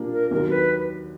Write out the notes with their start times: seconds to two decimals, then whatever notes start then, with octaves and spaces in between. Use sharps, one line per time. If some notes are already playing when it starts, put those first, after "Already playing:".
Already playing: A#2 G3 A#3 D4
0.13 A#4
0.31 D#2 D#3 F#3 A#4
0.50 B4